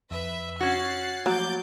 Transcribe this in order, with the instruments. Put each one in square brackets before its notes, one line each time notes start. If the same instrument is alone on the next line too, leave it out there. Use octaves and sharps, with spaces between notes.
[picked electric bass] F2 [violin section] B4 E5
[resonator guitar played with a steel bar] C#4 F#4 [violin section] F#6 A6 C7
[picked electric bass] F3 A3 A#3 [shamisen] F#3 [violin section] D6 G6 A6